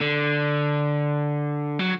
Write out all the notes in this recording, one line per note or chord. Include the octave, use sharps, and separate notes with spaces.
D3
F#3